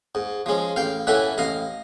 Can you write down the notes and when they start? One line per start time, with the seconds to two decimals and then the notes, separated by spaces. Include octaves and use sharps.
0.15 G#2
0.46 F3 G#3 C#4
0.76 A1 F5 G5
1.07 A2 E3 A3 C#4 E5 F#5
1.38 A1 D#5 F5